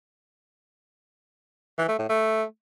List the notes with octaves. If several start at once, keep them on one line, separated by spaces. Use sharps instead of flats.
E3
A3
A2
A3